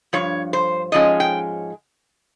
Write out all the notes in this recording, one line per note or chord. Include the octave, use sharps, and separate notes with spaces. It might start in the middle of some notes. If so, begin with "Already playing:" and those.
G2 F3 C#5
C5
G#2 F3 G#3 C#4 D#5
G5